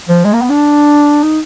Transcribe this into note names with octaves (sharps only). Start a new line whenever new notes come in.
F3
G#3
A#3
B3
D4
D#4